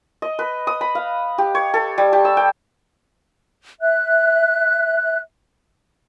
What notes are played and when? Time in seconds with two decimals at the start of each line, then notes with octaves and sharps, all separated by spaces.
0.22 D#5
0.39 B4
0.67 D#6
0.81 B5
0.95 F5
1.38 G4
1.55 C#5
1.74 A4
1.98 G3
2.13 G4
2.25 E6
2.37 G5
3.81 E5 F#6